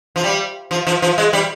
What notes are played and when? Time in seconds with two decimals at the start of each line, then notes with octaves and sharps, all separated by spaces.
0.16 F3
0.24 G3
0.71 F3
0.87 F3
1.02 F3
1.18 G#3
1.33 G3